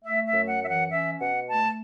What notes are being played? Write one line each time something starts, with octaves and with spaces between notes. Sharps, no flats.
A3 E5
E5
F#2
F#5
E3 E5
F#5
C#4 E5
B2 F#5
A3 A5